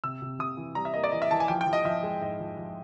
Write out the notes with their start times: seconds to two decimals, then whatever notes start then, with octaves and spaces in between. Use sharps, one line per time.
0.04 C3 E6
0.22 C3
0.39 C3 D#6
0.57 E3
0.75 G3 A#5
0.85 E5
0.94 A#3 D#5
1.04 D5
1.12 E3 D#5
1.22 E5
1.31 E3 A5
1.40 G#5
1.48 F3 G5
1.61 G5
1.67 F3
1.73 D#5
1.85 F3 E5
2.03 G#3
2.21 G#2 D#5
2.40 F3
2.58 F3